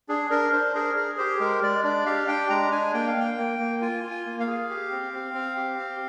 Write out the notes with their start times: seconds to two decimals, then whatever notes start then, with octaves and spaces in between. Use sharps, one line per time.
0.09 D4 G#4
0.30 D4 A#4
0.52 D4 C5
0.75 G#4 A#4
0.96 G#4 A#4
1.18 G4 C5
1.40 G#3 A#4
1.62 G#3 D5
1.84 D4 D5
2.06 G4 F5
2.28 D4 G5
2.50 G#3 A#5
2.72 D4 G#5
2.93 A#3 G5
3.07 F5
3.15 A#3 G5
3.37 A#3
3.59 A#3
3.81 F4 G#5
4.03 F4
4.11 G#5
4.25 A#3
4.40 F5
4.47 G#4
4.69 G4
4.92 C4
5.13 C4
5.34 C4
5.57 G4
5.79 C4